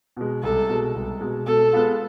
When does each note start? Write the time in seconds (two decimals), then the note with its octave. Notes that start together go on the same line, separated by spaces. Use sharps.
0.17 B2 G#3
0.42 C2 A4
0.69 B2 G#3
0.95 C2
1.21 B2 G#3
1.46 B2 A4
1.73 G#3 B3 F4